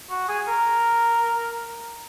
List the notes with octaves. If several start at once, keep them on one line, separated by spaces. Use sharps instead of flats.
F#4
G#4
A#4